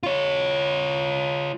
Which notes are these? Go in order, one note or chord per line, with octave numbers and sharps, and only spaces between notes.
F4 C#5